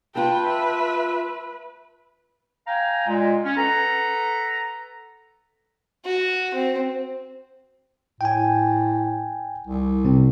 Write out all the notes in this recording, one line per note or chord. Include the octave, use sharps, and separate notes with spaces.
F4 B4 G5 A5
E5
F5 G5 G#5 A#5
A#2 G#3
C#4
A4 B4 F#5 A#5
F#4
C4
A2 G5 G#5
C2
C3 C4